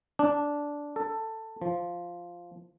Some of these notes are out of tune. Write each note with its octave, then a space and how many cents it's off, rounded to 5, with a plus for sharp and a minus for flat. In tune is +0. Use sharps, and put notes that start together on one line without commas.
D4 -10
A4 +15
F3 +0